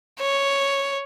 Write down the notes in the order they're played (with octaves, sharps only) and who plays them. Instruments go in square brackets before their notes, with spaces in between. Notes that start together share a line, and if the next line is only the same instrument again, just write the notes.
[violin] C#5